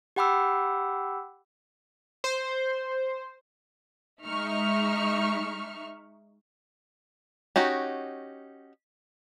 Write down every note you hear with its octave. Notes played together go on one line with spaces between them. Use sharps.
G4 F#5 G5 B5 D6 E6
C5
G#3 D#4 E5 C#6 F6
C#4 D#4 F#4 G4